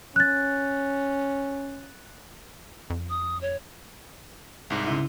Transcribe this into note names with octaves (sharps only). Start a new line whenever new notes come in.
C#4 F#6 A6
F2
D#6
C#5
C2 G#2
C#3 E4